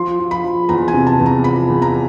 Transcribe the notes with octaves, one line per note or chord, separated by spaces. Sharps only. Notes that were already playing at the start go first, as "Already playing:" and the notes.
Already playing: F3 C6
F3
B5
F3
E2 A#5
G#5
C3
A5
E2
A#5
F3 B5
E2
A#5